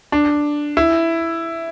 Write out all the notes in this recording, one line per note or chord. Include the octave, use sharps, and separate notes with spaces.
D4
E4